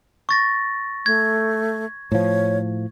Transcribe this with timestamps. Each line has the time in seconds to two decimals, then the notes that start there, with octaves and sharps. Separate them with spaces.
0.29 C#6 A6 A#6
1.06 A3 G#6
2.12 A2 F3 C#5